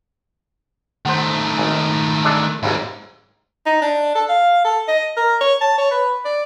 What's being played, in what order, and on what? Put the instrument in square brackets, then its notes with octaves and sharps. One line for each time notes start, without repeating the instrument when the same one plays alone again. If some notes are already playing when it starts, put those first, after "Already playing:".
[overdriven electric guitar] D#3 A3 [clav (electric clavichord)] C5 F#5
[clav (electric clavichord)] G#1 G#5
G#3 D4 A4
[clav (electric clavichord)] G#1 D#2 E4 [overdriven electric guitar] G#2
[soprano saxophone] D#4
D4
A4
F5
A4
D#5
A#4
C#5
A5
C#5
B4
D5